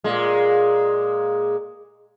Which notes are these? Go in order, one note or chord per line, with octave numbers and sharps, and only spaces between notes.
A#2 G#3